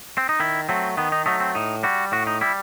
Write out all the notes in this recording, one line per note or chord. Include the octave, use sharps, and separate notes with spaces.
C4
D#4
D#3 E4
F#3 A3 C4
D#3 B3
D#4
F#3 A3 D#4
C4
A2 D#4
G3 F#4
A2 F#4
D#4
G3 E4